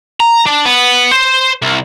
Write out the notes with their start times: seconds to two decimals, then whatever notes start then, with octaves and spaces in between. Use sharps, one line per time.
0.20 A#5
0.46 D4
0.65 B3
1.11 C5
1.62 C2